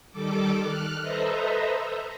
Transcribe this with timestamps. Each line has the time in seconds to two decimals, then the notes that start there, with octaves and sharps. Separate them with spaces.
0.11 D#3 G3 A4 D6
0.60 F6 F#6
1.01 A4 B4 C5 D#5 E5 A#5